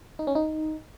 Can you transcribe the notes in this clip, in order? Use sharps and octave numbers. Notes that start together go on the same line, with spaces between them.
D#4
C#4
D#4